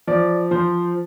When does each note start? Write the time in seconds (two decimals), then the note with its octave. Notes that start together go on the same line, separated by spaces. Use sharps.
0.07 F3 D5
0.51 F3 C5